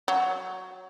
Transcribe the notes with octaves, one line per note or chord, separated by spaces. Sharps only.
F#3